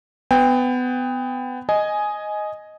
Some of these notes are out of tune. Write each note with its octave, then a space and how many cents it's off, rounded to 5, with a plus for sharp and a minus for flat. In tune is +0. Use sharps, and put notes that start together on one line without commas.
B3 +25 G5 +30
D#5 +0 G#5 +10